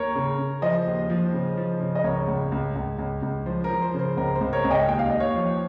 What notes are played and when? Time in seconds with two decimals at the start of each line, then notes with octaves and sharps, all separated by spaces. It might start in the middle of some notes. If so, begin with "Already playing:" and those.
Already playing: D#2 A#4 C#5
0.15 C#3
0.39 C#3
0.62 F3 C5 D#5
0.86 D#2
1.10 F3
1.33 C#3
1.57 F3
1.81 C#3
1.95 D#5
2.04 C#2 A#4 C#5
2.28 C#2
2.52 C#2
2.75 C#2
2.99 C#2
3.23 C#2
3.46 F3 C5
3.64 A#4
3.70 F3
3.82 C5
3.94 C#3
3.99 C5
4.17 C#2 A#4
4.35 C5
4.41 C#2
4.53 A#4 C#5
4.65 C#2
4.70 D#5 G5
4.88 D#2 G5
4.99 F5
5.10 D#2 D#5
5.20 C#5 F5
5.36 F3